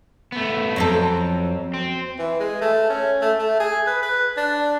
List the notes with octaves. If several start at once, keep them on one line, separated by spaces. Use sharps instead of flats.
A3 B3
F2 F#3 C4 A4
C4
E3
G#3
A3
C#4
A3
A3
G#4
B4
B4
D4